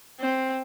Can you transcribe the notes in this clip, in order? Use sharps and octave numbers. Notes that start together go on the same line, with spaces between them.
C4